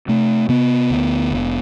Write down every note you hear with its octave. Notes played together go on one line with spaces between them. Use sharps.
C3 A3
C3 B3
D2
F1